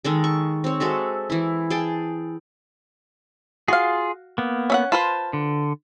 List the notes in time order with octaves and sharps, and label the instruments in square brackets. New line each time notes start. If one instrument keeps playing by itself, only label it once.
[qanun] D#3 G#3 A4
C#6
C4 C#5
G#3 F#4 A4 E5
E3 E4
G#4 G5 A5
[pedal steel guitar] F4 G#4 [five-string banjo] F#4 F5
[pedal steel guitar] A#3 B3
[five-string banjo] C#4 E5 F#5
[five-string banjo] F4 B4 C5 [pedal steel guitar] A5
[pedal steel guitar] D3